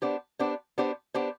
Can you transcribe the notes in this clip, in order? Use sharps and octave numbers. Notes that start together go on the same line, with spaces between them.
B3 D4 G4 C5
B3 D4 G4 C5
B3 D4 G4 C5
B3 D4 G4 C5